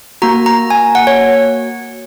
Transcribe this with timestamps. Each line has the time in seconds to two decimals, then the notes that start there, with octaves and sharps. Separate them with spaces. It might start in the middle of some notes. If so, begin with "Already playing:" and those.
0.22 A#3 F#4 A#5
0.46 A#5
0.70 G#5
0.95 F#5
1.07 C#5